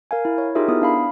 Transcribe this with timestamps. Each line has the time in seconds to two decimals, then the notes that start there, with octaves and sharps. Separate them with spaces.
0.11 A#4 F5 G#5
0.25 E4
0.38 C#5
0.55 D#4 F4 G4 G#4 A#4 E5
0.68 B3 E4 D#6
0.82 D4 F5 B5